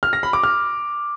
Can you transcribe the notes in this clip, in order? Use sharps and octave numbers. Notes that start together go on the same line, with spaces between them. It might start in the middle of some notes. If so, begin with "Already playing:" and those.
F6
A#6
B5
D6
F6